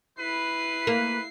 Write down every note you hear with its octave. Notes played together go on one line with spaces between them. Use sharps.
E4 B4 C7
A#3